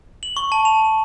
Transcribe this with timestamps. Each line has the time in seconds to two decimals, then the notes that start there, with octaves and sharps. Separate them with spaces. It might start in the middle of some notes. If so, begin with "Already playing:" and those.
0.23 F#7
0.37 C#6
0.52 A5
0.65 F7